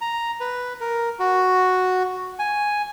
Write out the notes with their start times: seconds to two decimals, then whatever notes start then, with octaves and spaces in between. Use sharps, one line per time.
0.01 A#5
0.40 B4
0.81 A#4
1.19 F#4
2.39 G#5